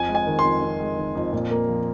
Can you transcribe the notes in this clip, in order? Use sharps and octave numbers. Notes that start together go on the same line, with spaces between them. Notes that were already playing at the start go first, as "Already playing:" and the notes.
Already playing: F2 G#5
G#3
G#5
D#3
C6
F2
F2
G#3
D#3
F2
A#2
A#3
F3